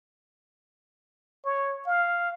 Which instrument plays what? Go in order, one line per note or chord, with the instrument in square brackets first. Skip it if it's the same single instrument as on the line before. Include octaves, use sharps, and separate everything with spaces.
[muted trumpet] C#5
F5